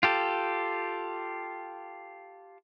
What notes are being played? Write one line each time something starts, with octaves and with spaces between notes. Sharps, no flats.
F4 G4 A4